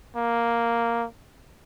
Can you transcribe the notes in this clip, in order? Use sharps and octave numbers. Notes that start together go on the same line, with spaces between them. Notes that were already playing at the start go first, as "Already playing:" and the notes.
A#3